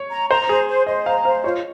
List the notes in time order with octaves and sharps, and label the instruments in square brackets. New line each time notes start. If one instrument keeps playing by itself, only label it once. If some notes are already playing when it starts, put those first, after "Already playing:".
Already playing: [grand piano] C#5
[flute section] A#5
[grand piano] C5 [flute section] A#5
[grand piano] G#4 [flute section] C5
[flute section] C5
[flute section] C5 [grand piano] D#5
[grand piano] F5 [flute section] A#5
[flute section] C5 [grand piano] F5
[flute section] F4 [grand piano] C#5